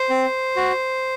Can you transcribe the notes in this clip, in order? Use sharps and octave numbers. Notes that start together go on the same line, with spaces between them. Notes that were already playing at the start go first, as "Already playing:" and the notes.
Already playing: C5
C4
F#4